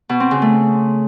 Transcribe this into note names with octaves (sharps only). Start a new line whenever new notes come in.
B2
C4
C#3
A3